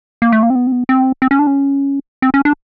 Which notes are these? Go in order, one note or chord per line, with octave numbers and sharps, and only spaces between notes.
A#3
A3
A#3
C4
B3
C4
B3
C4
C4
C#4
D4
C#4
C4
C#4
D4